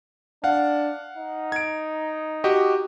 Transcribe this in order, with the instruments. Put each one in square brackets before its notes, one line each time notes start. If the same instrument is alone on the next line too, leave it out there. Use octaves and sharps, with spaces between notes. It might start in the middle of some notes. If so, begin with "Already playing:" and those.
[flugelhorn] D4 [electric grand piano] F5 F#5
[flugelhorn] D#4
[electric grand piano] G#6 D7
F#4 G4 D#5